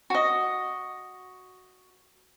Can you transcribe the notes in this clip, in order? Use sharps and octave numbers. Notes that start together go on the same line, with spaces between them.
F#4 D#5